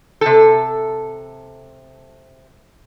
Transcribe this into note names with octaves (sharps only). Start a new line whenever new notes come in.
C3 A4